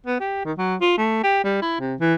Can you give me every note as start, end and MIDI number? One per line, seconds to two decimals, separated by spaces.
0.06 0.19 59
0.20 0.45 67
0.45 0.53 51
0.58 0.76 54
0.81 0.94 65
0.97 1.23 57
1.24 1.43 67
1.44 1.59 55
1.62 1.79 64
1.80 1.95 48
2.00 2.14 52